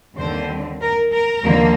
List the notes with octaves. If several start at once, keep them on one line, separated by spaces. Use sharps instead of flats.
D#2 D3 G3 C4 C5
A#4
A#4
D#2 D3 F3 A#3